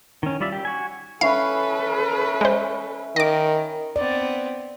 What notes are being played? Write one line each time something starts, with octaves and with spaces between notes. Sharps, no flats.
D#3 C#4
G3 F4 D5 E5
G4
F#4 G#5
C#4 E4 A4 B4 F5
G#3 C5
D#3 D#5 D6
B3 C4 D5